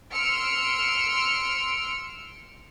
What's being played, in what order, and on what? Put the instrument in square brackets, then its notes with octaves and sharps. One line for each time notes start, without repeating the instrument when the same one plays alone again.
[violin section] C6 E6 F6 C#7 D7